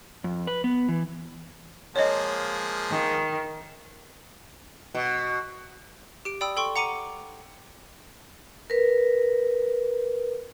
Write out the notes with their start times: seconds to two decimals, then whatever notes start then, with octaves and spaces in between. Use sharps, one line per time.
0.24 F2
0.47 B4
0.64 B3
0.89 E3
1.96 F3 G#3 A#3 C#5 D#5
2.91 D#3
4.95 B2
6.25 G4 D7
6.41 D5 G5 B5 D#6 E6
6.57 A4 G5 C6 C#6
6.76 F#5 A#5 D6 C#7 D#7
8.70 A#4 B4